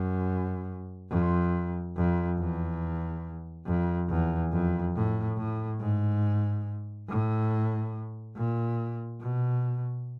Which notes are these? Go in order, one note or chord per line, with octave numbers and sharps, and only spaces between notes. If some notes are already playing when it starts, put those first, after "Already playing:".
Already playing: F#2
F2
F2
E2
F2
E2
F2
A2
A2
G#2
A2
A#2
B2